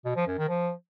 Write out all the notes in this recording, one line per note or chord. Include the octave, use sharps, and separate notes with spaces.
B2
F3
F#2
D#3
F3